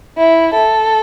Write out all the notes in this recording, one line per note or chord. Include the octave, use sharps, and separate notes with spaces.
E4
A4